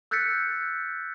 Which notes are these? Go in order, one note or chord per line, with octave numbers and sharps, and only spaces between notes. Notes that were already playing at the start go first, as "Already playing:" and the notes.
E6 F#6 G6 A6 B6 C#7